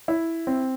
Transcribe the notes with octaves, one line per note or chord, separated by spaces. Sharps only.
E4
C4